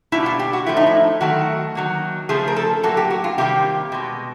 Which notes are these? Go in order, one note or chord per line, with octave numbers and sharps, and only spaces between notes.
B2 G3 A#3 E4
F4
G4
F#4
A2 F3 A3 E4
D#4
E4
D#3 F#3 A3 F#4
D#3 F#3 A#3
C#3 F3 A3 G#4
A#4
A4
A2 F#3 A#3 A4
G4
F#4
F4
C3 D#3 G3 A#3 G4
B2 G#3